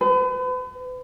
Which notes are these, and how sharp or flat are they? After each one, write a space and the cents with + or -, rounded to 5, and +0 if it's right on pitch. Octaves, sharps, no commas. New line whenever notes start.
B4 +40